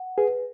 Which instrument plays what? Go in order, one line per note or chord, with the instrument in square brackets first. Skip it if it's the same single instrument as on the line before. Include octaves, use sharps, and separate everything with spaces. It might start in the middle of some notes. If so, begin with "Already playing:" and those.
Already playing: [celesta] F#5
[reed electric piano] G#4 [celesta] B4